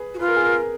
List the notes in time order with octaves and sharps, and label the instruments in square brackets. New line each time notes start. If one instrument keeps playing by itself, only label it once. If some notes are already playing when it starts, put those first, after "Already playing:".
Already playing: [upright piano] G#4 B4
[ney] F#4
[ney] F4 [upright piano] B4
[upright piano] A#4
G#4
A#4